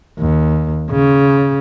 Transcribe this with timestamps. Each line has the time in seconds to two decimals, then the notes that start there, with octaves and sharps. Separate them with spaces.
0.19 D#2
0.91 C#3